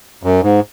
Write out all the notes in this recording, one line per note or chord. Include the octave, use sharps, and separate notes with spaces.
F#2
G#2